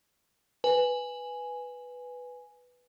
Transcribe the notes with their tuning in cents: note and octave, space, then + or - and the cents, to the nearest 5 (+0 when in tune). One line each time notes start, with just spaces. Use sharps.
B4 +0 G#5 +0